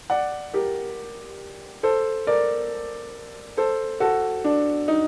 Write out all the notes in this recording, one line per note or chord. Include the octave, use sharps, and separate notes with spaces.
D5 F#5
G4 A#4
A4 C5
A#4 D5
A4 C5
F#4 A4
D4
D#4